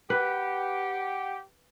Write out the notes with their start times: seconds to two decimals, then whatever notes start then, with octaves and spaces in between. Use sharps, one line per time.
0.10 G4 B4 F#5